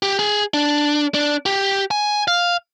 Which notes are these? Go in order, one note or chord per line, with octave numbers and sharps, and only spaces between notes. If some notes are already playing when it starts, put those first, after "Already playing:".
G4
G#4
D4
D4
G4
G#5
F5